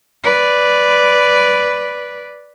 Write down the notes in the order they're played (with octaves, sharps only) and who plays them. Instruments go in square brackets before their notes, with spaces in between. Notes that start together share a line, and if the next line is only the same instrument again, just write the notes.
[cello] B4 D5